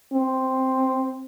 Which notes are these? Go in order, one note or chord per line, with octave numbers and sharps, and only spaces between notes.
C4